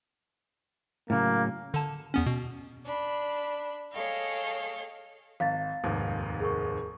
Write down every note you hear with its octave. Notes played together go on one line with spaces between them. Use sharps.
A2 C#3 F#3 A#3
D3 A5
E2 B3 C#4
B2
D4 B5
G#4 A4 C#5 D#5 F5 G5
G#1 F5 A6
F1 D#2 G#2
G#4 A#4 C#6